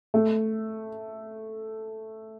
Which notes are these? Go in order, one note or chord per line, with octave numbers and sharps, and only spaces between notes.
A3